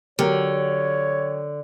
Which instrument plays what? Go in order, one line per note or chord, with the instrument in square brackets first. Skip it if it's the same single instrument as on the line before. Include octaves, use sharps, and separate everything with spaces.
[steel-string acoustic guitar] D3 [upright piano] F#3 G4 A#4 [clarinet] C#5